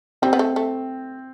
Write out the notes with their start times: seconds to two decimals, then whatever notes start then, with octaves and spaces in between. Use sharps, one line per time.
0.22 G3 C4
0.33 B3
0.39 A3
0.56 A3